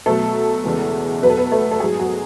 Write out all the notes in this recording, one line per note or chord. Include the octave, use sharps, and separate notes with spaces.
B2 F#3 A3 A4
E2 C#3 E3 G#3
B2 F#3 B4
A4
B3 B4
A3 A4
A4
G#2 F#3 G#3 G#4
F#3 F#4